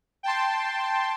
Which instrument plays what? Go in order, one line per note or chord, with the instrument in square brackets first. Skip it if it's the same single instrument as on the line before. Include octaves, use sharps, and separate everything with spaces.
[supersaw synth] G5 A5 C6